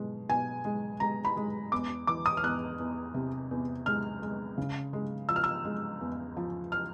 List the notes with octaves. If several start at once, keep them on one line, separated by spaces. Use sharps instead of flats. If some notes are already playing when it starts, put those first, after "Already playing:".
Already playing: B2 G#3
B2 G#5
G#3
G#3 A#5
B5
G#3
E2 D6
E3 D6
D#6
F6
E2 F#6
E2
C3
E2
G#3 F6
G#3
C#3
G#3
F3 E6
F6
E6
G#3
E2
F3
F6